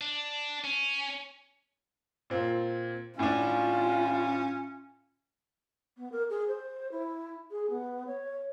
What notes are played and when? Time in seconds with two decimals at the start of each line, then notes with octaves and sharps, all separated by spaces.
0.01 D4
0.64 C#4
2.30 A#2 C4 F4
3.19 A2 C#4 D4 F4
5.96 B3
6.11 A#4
6.29 G#4
6.48 C5
6.91 E4
7.51 G#4
7.69 B3
8.07 C#5